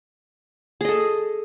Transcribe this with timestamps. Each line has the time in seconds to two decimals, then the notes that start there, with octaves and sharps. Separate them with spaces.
0.81 G#4
0.85 D#5
0.89 A4